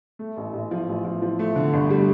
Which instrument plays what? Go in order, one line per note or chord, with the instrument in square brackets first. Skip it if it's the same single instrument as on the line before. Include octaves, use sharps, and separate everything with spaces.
[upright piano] A3
A1
A1
F3
A1
F3
F3
A3
D3
G1
G3